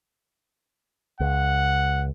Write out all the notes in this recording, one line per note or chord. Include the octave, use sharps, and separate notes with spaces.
C#2 F#5